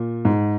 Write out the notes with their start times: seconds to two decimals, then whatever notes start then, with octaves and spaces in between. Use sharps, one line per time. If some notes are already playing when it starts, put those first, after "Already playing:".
Already playing: A#2
0.25 G#2